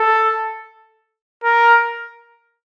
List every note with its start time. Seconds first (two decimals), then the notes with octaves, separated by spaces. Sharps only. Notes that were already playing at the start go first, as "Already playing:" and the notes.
Already playing: A4
1.44 A#4